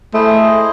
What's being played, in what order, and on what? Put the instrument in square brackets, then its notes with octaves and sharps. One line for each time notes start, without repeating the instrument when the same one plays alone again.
[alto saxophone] A3 [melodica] E4 G#4 C5 D#5